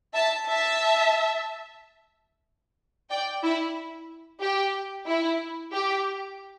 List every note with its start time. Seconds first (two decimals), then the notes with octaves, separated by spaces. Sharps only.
0.15 E5 A5
0.48 E5 A5
3.10 D5 G5
3.43 E4
4.41 G4
5.07 E4
5.73 G4